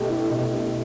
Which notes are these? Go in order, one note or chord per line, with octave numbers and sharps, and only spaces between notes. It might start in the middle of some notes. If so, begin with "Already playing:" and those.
Already playing: B2 A3 G4
E4
B2
G4